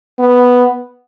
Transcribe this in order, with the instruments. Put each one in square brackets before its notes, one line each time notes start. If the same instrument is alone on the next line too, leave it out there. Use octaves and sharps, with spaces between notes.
[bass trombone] B3